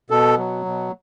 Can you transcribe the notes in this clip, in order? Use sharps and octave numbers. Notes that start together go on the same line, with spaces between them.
B2 A4
F#3
B2